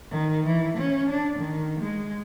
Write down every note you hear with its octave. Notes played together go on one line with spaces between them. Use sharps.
D#3
E3
C#4
D4
D#3
G#3